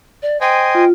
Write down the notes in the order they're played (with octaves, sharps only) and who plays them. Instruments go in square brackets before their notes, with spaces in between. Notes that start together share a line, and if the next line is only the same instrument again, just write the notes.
[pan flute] D5
[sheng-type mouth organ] C5 D#5 G#5 [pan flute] G5
[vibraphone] F4